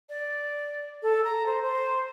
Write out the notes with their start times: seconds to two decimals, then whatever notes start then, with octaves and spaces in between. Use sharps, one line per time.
0.09 D5
1.02 A4
1.24 A#5
1.46 C5
1.62 C5